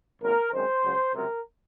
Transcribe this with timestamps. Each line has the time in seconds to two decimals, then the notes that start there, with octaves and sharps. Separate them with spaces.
0.21 G#1 F#2 D#3 A#3 A#4
0.52 F#2 D#3 G#3 C4 C5
0.83 C#2 C#3 F#3
1.13 C#2 C3 F#3 C4 A#4